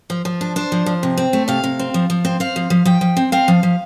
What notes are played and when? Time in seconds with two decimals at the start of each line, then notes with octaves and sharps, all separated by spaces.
0.10 F3
0.25 F3
0.41 D4
0.56 D4 C5
0.72 F3
0.86 F3
1.03 C3
1.18 C4
1.33 A3
1.48 C3 F5
1.64 C3
1.79 C4
1.94 F3
2.10 F3
2.25 C4
2.40 C4 F5
2.56 F3
2.70 F3
2.85 F3 G5
3.01 F3
3.17 C4
3.32 C4 F5
3.48 F3
3.63 F3